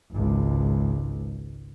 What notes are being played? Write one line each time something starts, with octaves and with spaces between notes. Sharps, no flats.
G#1 C#2